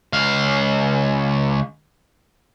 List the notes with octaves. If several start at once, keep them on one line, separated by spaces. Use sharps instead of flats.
C#2 F5